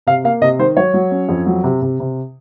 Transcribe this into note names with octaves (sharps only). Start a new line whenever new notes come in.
C3 F5
A#3 F5
C3 D#5
D#3 C5
F#3 C#5
F#3
C#4
F2
F#3
C3
C3
C3